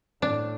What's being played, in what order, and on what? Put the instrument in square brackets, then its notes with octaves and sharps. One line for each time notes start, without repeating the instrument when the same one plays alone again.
[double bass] A2 [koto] D4